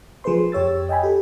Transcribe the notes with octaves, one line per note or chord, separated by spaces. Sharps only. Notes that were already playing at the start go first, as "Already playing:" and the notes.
F3 G#4 B4 C5 C6
F2 G4 C#5 E6 A6
D#5 G5 G#5 B5
G4 A4